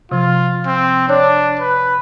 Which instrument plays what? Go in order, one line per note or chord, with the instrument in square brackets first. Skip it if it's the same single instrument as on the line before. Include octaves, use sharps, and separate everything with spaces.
[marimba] C3 F3 [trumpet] F4
[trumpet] C4
[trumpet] D4 [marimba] C#5 F#6
[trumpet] B4